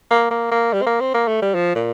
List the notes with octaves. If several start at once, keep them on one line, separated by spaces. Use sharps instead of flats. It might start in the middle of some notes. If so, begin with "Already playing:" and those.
A#3
A#3
A#3
G3
C4
A#3
C4
A#3
A3
G3
F3
A#2